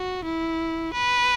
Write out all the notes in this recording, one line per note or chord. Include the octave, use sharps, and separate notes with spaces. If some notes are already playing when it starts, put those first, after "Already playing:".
Already playing: F#4
E4
B4